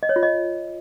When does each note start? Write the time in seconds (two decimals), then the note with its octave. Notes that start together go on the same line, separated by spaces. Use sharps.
0.03 D#5
0.09 C#5
0.16 F4
0.23 D#5